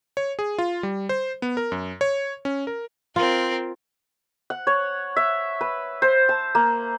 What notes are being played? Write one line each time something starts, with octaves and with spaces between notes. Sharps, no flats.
C#5
G#4
F4
G3
C5
B3
A#4
F#2
C#5
C#4
A#4
C4 F4 A#4
F#5
C#5
E5
B4
C5
A5
A#3